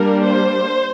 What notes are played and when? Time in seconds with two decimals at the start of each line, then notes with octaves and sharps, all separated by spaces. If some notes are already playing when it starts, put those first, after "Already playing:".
Already playing: G3 A#3 D4 A#4
0.24 C5